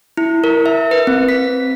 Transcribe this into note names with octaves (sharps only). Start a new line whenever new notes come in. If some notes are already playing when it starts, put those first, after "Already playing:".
E4
A#4
E5
B4
C4
B6